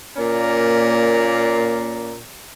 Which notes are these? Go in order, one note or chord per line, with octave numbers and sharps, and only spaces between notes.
A#2 A#3 C#4 D5 A#5